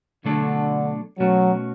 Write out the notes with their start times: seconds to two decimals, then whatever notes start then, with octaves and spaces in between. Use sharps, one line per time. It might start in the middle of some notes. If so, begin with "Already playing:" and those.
0.24 B2 D3 F#3 A3 D4 A4
1.19 B2 F#3 A3 C#4 F#4